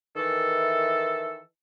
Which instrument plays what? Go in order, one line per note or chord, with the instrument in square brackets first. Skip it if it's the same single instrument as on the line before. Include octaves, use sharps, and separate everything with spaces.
[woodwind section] D#3 E3 A4